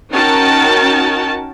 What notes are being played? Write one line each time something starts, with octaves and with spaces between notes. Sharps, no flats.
C#4 D#4 F#4 A#4 G5 A5